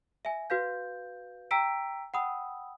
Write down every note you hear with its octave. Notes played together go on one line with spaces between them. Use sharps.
E5 G#5
F#4 B4 F5 G6
G5 A#5 E6 B6 D7
F#5 G5 B5 D#6 E6